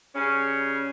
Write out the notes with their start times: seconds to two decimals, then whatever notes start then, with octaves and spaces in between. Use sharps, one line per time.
0.15 C#3 G3 C#4